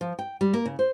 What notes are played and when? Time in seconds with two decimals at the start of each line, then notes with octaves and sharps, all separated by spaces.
0.01 F3
0.19 G5
0.41 G3
0.54 A#3
0.66 C#3
0.79 C5